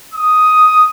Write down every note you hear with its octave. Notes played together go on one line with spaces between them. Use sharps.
D#6